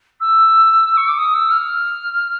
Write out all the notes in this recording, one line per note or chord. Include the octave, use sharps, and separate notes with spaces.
E6
C#6
D6
D#6
E6
F6